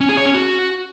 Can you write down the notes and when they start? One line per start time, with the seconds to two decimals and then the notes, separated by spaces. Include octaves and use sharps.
0.01 C#4
0.09 G#4
0.17 C#5
0.26 C#4
0.34 F#4